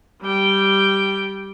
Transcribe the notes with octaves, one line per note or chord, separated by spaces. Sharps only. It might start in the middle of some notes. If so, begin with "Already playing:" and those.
G3 G5